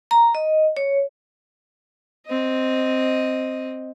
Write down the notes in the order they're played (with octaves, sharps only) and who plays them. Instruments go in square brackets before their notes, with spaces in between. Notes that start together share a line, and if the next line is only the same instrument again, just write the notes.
[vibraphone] A#5
D#5
C#5
[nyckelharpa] C4 D#5